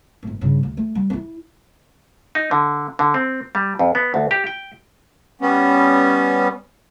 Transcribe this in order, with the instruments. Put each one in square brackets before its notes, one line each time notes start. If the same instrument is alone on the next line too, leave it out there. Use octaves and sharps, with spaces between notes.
[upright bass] G1 A2
G2 C#3
D2
A3
G3
C4 E4
[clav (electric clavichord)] D#4
D3
D3
C4
G3
F2
B3
D2
G4
G5
[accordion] G3 B3 C#4